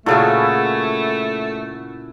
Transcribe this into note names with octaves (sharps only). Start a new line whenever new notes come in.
A#2 C#3 A3 E4 F#4 G#4 A4